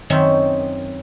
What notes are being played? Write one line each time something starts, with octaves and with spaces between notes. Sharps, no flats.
F#2 D#3 C4 C#4 E5